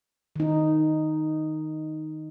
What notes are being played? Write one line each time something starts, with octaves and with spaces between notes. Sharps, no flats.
D#3 D#4